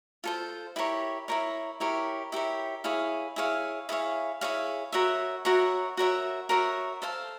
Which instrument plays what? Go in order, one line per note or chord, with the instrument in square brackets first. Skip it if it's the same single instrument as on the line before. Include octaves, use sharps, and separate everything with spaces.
[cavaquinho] F4 A4 C5
E4 G4 A#4 C#5
E4 G4 A#4 C#5
E4 G4 A#4 C#5
E4 G4 A#4 C#5
E4 G#4 C#5 F5
E4 G#4 C#5 F5
E4 G#4 C#5 F5
E4 G#4 C#5 F5
F#4 A#4 C#5 E5
F#4 A#4 C#5 E5
F#4 A#4 C#5 E5
F#4 A#4 C#5 E5
A4 C5 F5 A5